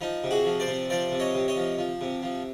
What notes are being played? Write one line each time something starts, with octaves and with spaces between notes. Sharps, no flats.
F3 D#4
C3
F#4 G#4
F3
C5 D5
C3
F3 C5 D5
C3
C#5 D#5
C3
C#5 D#5
F3
F3
C3
F3